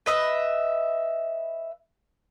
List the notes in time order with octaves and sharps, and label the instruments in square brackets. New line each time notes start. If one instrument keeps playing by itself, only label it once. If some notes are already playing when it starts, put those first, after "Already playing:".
[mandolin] B4 D#5 E5